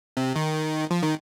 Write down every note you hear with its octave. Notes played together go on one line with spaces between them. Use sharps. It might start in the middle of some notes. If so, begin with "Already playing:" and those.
C3
D#3
F3
D#3